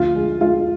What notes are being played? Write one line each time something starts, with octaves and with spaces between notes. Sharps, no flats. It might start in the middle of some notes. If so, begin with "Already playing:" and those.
Already playing: D2 F3 F4
G#3
G#3 F4